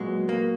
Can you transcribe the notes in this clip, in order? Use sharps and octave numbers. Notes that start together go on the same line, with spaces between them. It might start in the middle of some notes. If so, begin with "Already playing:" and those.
Already playing: A#2 F#3 G#3 B3 F#4
A#3